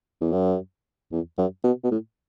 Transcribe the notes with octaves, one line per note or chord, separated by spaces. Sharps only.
E2
F#2
E2
F#2
B2
B2
A2